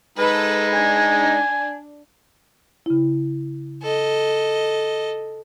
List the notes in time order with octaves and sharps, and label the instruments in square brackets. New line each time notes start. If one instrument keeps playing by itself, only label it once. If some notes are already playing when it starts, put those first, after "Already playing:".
[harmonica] G#3 D#4 [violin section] A4 B4
[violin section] D4 [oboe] G#5
[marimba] C#3 E4
[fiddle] A4 D#5